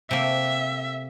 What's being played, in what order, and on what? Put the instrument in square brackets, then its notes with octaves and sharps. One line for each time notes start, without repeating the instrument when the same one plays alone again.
[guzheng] C3 A3 A#3 [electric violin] E5